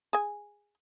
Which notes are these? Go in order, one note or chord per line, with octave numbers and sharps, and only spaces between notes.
G#4 G#5